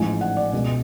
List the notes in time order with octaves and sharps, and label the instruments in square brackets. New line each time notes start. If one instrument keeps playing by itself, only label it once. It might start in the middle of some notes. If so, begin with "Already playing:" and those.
Already playing: [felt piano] A1 G#2 F3 G#5
F#5
D5
C#2 B2